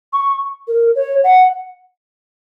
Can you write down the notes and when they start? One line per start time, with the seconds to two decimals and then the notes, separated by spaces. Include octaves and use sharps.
0.13 C#6
0.68 A#4
0.95 C#5
1.24 F#5